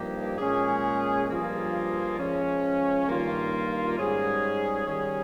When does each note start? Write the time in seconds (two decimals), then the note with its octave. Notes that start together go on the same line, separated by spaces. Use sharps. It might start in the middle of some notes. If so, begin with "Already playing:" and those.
Already playing: G2 F3 A#3 D#4 G4
0.38 A#2 G#3 C#4 G#4
1.29 G2 F3 A#3 F4 G#4
2.18 F3 G#3 C#4
3.07 G2 D#3 A#3 F4
3.97 G#2 G3 C#4 G#4
4.86 D#3 G3 C#4 G#4